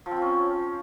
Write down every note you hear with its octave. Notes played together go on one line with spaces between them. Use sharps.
F3
C4
F3
C#4